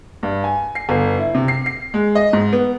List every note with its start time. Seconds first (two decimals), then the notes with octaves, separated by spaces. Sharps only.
0.23 G2
0.44 G#5
0.75 C7
0.89 G1
1.18 E4
1.35 C3
1.48 C7
1.66 C7
1.94 G#3
2.15 D#5
2.33 G#2
2.53 B3